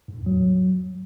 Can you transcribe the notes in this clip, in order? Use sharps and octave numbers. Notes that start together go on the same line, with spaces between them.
G#2
A2
E2
F#3